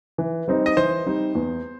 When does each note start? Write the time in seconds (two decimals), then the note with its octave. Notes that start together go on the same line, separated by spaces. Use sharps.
0.18 E3
0.48 G3 C4 D#4
0.66 D#5
0.77 E3 C5
1.06 G3 C4 D#4
1.35 E2